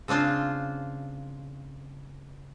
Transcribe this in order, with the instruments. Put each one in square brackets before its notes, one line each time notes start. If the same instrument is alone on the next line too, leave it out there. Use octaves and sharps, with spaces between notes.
[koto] C#3 C4 D4 F4 C5